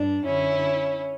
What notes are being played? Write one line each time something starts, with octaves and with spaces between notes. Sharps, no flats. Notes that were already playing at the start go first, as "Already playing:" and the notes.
Already playing: G2 D4
F#2 D3 C#4 E4